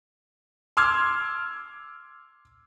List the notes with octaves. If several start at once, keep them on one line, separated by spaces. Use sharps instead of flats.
C6 D6 E6 F6 G#6